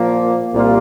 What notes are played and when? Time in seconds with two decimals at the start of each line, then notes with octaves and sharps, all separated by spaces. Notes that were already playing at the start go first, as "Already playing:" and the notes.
Already playing: A#2 F3 A#3
0.54 C2 A#2 A#3 F4